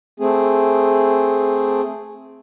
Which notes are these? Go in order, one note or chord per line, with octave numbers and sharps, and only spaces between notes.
A3 C4 G#4